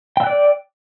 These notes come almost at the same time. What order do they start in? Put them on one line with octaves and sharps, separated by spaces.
G5 E6 F#6 D5